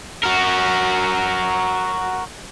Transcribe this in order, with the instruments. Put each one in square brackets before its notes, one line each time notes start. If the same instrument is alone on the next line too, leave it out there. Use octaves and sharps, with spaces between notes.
[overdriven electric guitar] F#4 A#4